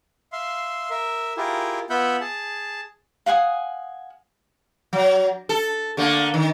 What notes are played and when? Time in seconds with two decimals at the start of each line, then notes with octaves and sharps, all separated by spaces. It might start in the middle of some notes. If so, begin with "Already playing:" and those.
0.32 E5 F5 C6
0.90 A#4 E5
1.37 E4 F4 G4 G#4 A#4
1.90 B3 F4 E5 F#5 B5 G6
2.20 G#4 A5
3.26 F5 F#5 G#5 D#6
4.93 F#3
5.49 A4
5.97 D3 A3 A#3
6.34 D#3